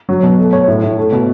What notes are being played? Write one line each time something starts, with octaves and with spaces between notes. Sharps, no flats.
F#3
B2
A3
C#5
A2
A2
A3
B2